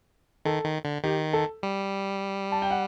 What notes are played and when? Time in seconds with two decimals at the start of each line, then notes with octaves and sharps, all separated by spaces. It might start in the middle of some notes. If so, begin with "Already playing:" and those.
0.45 D#3 A4
0.65 D#3
0.85 D3
1.04 D#3 G4
1.33 A4
1.63 G3
2.52 A5
2.62 G5
2.71 F#5